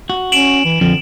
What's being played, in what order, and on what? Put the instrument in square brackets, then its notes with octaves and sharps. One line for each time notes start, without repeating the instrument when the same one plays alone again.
[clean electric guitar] F#4
[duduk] C#4 [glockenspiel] D7 E7 F#7
[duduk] E3
[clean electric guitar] F2 F3 [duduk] D3